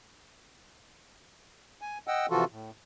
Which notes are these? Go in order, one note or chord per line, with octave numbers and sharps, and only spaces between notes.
G#5
D#5 F#5 G5 E6
C3 E3 F3 F4 F#4 A4
A2